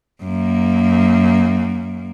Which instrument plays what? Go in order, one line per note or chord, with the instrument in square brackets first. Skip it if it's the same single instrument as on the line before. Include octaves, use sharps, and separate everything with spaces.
[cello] F#2 A#3